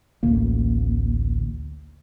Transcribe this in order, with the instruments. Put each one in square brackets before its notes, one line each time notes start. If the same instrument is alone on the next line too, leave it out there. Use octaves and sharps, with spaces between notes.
[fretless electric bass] A1 D2 A#3